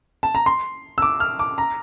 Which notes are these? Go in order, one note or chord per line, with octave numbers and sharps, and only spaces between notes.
A5
A#5
C6
E6
D6
F6
D6
A#5